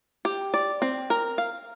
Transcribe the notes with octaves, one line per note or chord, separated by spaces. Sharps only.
G4
D5
C4
A#4
F5